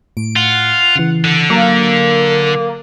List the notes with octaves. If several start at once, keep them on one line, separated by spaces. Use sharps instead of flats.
A2 D7
F4 F#5
C#3 E3
D3
F#3 A#3